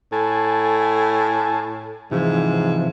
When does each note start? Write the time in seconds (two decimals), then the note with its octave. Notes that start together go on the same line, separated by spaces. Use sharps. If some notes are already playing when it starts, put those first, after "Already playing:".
0.12 A2 G#5 A5
2.11 G#2 C3 E3 F3